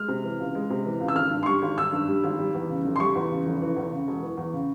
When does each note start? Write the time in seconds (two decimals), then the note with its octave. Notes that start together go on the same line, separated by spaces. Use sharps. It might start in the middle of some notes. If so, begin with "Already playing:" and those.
Already playing: G#3 F6
0.08 C3
0.24 E3
0.40 C#2
0.55 G#3
0.70 C3
0.86 E3
1.00 C#2
1.08 E6
1.15 G#1 F6
1.31 G2
1.43 C6
1.46 G3 C#6
1.62 G#1
1.77 G#1 E6
1.93 G2
2.08 G3
2.24 G#1
2.39 G3
2.54 E2
2.69 C#3
2.85 F1
2.96 C6
3.00 G3 C#6
3.15 E2
3.31 C#3
3.47 F1
3.61 E3
3.77 E2
3.92 C#3
4.07 E1
4.23 E3
4.37 E2
4.53 C#3